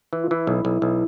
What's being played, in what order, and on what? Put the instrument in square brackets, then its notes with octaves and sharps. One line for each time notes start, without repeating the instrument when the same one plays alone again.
[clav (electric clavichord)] E3 [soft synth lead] E4
[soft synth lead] F4
[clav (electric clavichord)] E3 [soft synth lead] E4
[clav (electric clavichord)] B1
B1
B1